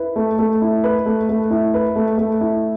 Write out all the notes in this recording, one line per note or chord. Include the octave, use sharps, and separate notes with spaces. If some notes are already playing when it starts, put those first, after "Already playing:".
Already playing: E4 B4
A3
A3
E4
B4
A3
A3
E4
B4
A3
A3
E4